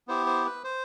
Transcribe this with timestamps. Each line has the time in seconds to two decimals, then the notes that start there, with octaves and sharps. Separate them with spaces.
0.08 B3 E4 G4 C5
0.27 C5
0.46 B4
0.64 C5